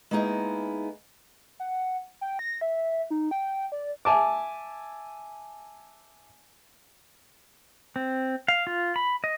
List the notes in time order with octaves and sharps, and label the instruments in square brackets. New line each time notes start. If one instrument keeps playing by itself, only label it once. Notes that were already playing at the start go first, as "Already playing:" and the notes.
[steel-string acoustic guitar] G#3 A#3 B3 D#4 E4 G#4
[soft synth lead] F#5
G5
A#6
E5
D#4
G5
D5
[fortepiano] E5 G#5 A5 D6
[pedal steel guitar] C4
F5
F4
B5
D#5